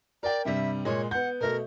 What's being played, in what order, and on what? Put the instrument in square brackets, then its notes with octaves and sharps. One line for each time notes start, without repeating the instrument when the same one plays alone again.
[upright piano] A#4 G5 [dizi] D5
[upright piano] G2 C3 G3 [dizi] E5
[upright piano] A#2 G#3 [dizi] C#5
[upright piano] B3 G6 [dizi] F#5
[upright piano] B2 A3 [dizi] A#4